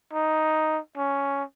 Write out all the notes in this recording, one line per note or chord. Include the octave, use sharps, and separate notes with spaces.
D#4
C#4